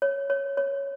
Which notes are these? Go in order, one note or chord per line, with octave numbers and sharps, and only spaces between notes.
C#5
C#5
C#5